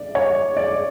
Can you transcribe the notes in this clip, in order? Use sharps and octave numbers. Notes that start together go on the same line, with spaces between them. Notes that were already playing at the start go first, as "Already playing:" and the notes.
Already playing: D5
C#5
D5